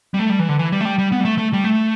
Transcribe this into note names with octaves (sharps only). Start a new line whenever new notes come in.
G3
A3
G3
E3
D3
E3
G3
A3
G3
G3
B3
G3
A3
A3
G3
A3